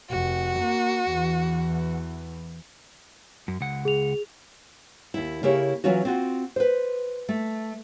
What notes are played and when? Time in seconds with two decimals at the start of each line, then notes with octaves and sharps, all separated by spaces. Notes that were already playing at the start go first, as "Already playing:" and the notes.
0.11 F1 F#4
0.60 A#3
1.10 E2 E3
3.48 F#2
3.61 C#2 F#5
3.85 G#4 F7
5.14 D#2 E4
5.43 C#3 A#3 E4 G4 A#4 C#5
5.84 E3 F#3 C#4 F4 F#4
6.05 C4 F4 F#4
6.56 B4 C5
7.29 A3